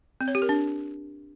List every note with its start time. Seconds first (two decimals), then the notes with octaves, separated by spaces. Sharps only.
0.21 C4
0.28 C#5
0.35 G4
0.42 A#4
0.49 D4